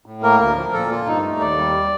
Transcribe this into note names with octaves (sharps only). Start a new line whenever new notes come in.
A2
A#3 A#4
D2 A#4
F3
A#2 A4
A#3 F4
G2 D#4
A3
D#2 D5
G3